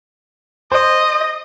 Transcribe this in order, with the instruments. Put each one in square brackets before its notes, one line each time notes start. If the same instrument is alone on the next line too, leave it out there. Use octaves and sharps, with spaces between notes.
[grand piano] C5 [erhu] D#5